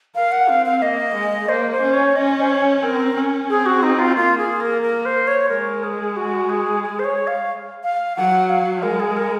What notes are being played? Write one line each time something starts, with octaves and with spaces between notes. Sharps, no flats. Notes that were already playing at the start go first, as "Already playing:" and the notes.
A#4 F5
F#5
C4 F5
F5
A#3 D#5
G#3
A#3 C5
C5
C#4
C#5
C#4 D#5
C5
C#5
C4 A#4
C#4
C4 G#4
F#4
D#4
F4
A#3 F4
G#4
A#4
A#4
C5
C#5
G#3 A#4
G#4
F#4
G#4
G#4
C5
C#5
F5
F5
F#3 F#5
F5
G#3 A#4
G#4
A#4